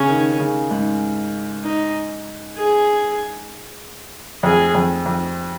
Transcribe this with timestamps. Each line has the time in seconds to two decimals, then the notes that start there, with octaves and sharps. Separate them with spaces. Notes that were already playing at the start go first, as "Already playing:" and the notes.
Already playing: C#3 C#4
0.09 D#3
0.40 C#3
0.71 G#2
1.64 D#4
2.58 G#4
4.43 F2 G#4
4.74 F2
5.06 F2